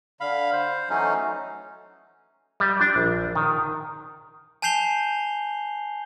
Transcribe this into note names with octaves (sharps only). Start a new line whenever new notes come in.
D3 F5 B5
C5
E3 F#3 A3 C#4 D#4
G3
D4
A#1
D#3
G#5 A5 G6 C7 F7 G7